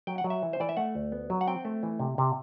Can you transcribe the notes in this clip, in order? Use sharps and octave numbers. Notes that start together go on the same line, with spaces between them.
F#3 G5
F#5
F#3
E5
E3
C5
E3 D5
E5
A3 F#5
D2
B3
F#3
F#5
C4 G5
A3
E3
C3
C3